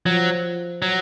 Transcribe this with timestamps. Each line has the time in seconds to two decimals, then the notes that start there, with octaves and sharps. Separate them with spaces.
0.05 F3 F#3
0.82 F#3